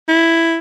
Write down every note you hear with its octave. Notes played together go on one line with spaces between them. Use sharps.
E4